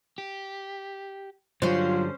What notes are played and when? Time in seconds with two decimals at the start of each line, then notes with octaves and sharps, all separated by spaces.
0.18 G4
1.62 G2 D3 F#3 C#4 F4 C5